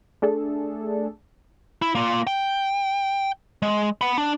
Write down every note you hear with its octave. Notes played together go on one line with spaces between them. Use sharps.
A3 D4 G#4 A4
E4
A#3 F4
G5
G#3
F#5 B5
D4